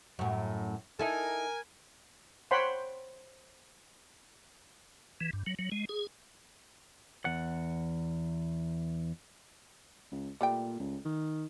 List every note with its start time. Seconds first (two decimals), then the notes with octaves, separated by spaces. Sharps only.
0.19 F#2 A2
0.99 D#4 E4 A4 A#4 G#5
2.51 C5 C#5 F#5 G5 B5 C6
5.21 E3
5.33 G2
5.47 F#3
5.59 F#3
5.72 G#3
5.89 G#4
7.25 E2 F#5
10.12 C#2
10.41 A#2 G3 A3 G5
10.79 C#2
11.05 D#3